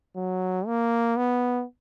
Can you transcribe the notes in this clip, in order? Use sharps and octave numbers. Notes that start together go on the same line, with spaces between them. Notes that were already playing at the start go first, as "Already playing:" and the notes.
F#3
A#3
B3